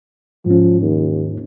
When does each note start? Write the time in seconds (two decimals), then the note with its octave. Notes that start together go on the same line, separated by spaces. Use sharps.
0.46 G#2 F3 C#4
0.82 D#2